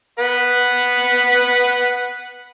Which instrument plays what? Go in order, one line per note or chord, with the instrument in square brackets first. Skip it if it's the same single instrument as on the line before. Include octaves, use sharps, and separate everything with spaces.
[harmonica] B4 F#5